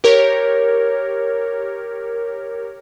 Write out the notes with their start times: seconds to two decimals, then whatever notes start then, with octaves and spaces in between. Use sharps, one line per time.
0.04 G4 A#4 C#5